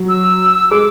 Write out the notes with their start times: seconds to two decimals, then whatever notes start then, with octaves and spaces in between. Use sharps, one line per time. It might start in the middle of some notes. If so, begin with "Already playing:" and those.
Already playing: F#3
0.09 E6
0.71 G#3 D6